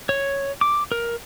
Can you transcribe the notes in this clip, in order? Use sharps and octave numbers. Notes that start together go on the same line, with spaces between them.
C#5
D6
A#4